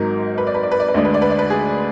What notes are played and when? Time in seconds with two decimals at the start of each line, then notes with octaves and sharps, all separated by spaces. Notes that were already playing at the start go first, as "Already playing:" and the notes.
Already playing: G#1 G#2 F#3 A#4
0.38 B4
0.47 D5
0.55 B4
0.63 D5
0.72 B4
0.80 D5
0.88 B4
0.94 D2 D3 G#3 D5
1.05 B4
1.14 D5
1.22 B4
1.30 D5
1.39 B4
1.50 G#4